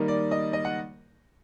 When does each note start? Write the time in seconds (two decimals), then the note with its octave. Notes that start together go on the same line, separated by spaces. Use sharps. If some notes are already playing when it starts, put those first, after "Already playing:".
Already playing: D#3 G3 A#3 D#5
0.08 D5
0.31 D#5
0.53 D#5
0.65 F#5